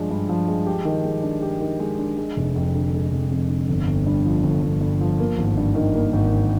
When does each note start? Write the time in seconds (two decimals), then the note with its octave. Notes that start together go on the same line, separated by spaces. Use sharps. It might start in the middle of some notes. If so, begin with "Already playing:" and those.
Already playing: G2 F3 G#3 D4
0.11 G2
0.29 F3
0.48 G#3
0.66 G4
0.85 D#3
1.04 G#3
1.23 D4
1.42 G4
1.60 D#3
1.80 G#3
1.99 D4
2.17 G#3
2.37 F1
2.56 F2
2.74 D3
2.94 G#3
3.12 F1
3.31 F2
3.49 D3
3.68 G1
3.87 G1
4.06 G2
4.25 F3
4.43 G1
4.63 G1
4.81 G2
5.01 F3
5.19 A#3
5.38 G#1
5.57 G2
5.75 D#3
5.95 A#3
6.13 G#1
6.32 G2